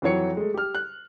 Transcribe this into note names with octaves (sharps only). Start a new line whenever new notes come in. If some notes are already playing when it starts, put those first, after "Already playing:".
F2 E3 F#3 C#5 C#7
G#3 A3
G4 F6
F#6